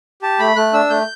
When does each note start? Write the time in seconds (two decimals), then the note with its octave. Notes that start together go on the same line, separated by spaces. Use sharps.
0.22 G4 A5
0.39 A3 B5
0.56 A3 F#6
0.73 D4 E6
0.90 A3 G6